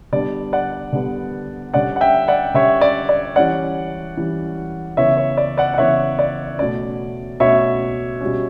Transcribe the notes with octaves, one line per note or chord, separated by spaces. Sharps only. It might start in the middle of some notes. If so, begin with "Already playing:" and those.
D3 G3 B3 D4 D5
D5 F#5
D3 G3 B3 D4
D3 G3 C#4 D5 F#5
F#5
E5 G5
D5 F#5
D3 G3 C#4 C#5 E5
D5
D5
E3 G3 C#4 D5 F#5
E3 G3 C#4
C#3 E3 B3 C#5 E5
C#5
D5
D5 F#5
F#5
C#3 E3 B3 C#5 E5
D5
B2 A3 C#4 D5
B2 A3 C#4 C#5 E5
B2 G3 C#4